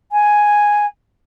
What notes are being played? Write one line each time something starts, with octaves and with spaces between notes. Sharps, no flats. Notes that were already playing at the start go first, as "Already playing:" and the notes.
G#5